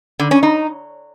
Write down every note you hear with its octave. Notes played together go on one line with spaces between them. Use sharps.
D3
C#4
D#4